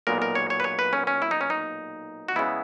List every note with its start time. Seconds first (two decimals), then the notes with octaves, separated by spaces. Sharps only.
0.07 B1 A#2 G#3 B3 A#4
0.22 A#4
0.35 C#5
0.50 C#5
0.60 B4
0.64 C#5
0.79 B4
0.93 C#4
1.07 C#4
1.22 E4
1.31 D#4
1.41 C#4
1.50 D#4
2.28 F#4
2.36 C#3 G#3 B3 E4